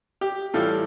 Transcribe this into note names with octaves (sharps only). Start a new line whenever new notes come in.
G4
A2 E3 G3 F4 A4